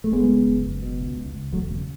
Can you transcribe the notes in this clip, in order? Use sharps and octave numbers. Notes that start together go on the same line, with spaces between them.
A3
F#1 G#3 B3
C#3
F#1
F#1
B2
C#2
C#2
C#2
E1 F#3 A3
C#3